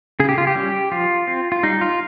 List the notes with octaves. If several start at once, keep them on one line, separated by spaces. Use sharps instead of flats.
C#3 G#4
G4
F4
G4
G3 C#4
F3 F4
C4
F4
G3 D#4
F4